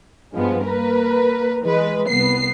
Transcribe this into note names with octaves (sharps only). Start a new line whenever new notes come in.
G2 F3 G#3 B3
A#3 A#4 B4
E3 G#3 B4
C2 B3 C7